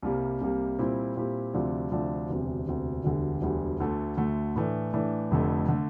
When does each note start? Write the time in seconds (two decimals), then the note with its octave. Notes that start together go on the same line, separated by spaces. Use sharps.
0.03 C2 C3 G3 A#3
0.41 C2 C3 G3 A#3
0.79 A#2 G3 C4 E4 G4
1.17 A#2 G3 C4 E4 G4
1.54 D2 C3 F3 A3 D4
1.92 D2 C3 F3 A3 D4
2.29 E1 D2 C3
2.67 E1 D2 C3
3.04 E1 D2 D3 G3
3.42 E1 D2 D3 G3
3.80 D2 D3 A3
4.17 D2 D3 A3
4.56 A2 E3 A3 D4
4.93 A2 E3 A3 D4
5.31 F1 F2 D3 A3
5.68 D3 A3